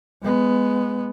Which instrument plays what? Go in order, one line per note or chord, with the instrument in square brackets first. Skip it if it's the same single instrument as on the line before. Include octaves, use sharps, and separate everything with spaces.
[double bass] G#3 B3